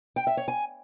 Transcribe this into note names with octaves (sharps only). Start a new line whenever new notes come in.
G5
E5
C#5
G#5